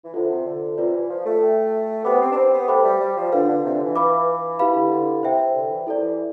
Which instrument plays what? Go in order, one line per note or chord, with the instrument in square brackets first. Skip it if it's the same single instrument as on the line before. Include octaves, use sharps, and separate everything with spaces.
[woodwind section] E3
[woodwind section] D3 [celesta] F4 A4 C5 E5
[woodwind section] C3
D3
[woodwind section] C3 [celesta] F4 B4 D5
[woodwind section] E3
F3
A3
[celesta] A4 E5 G5
[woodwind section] B3 [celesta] G4 C5 G5 B5 D6
[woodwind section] C4
D4
C4
B3
[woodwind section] A3 [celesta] G4 C5 G5 B5 D6
[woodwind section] G3
G3
F3
[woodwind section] D3 [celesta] D4 F4 B4 F5
[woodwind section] D3
C3
D3
E3
[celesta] B4 F5 B5 D6
[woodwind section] E3 [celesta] E4 G4 B4 F5 B5
[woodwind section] D3
D3
[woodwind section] C3 [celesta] C5 E5 G5
[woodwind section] D3
E3
[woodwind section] C3 [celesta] E4 A4 D5
[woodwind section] E3